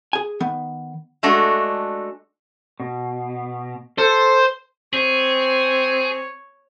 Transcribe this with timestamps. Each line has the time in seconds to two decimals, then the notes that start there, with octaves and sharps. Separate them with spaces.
0.13 G#4 G#5
0.40 D#3 B3
1.23 G#3 A3 D4 F#4
2.80 B2
3.98 A4 C5
4.93 C4 G#4 C#5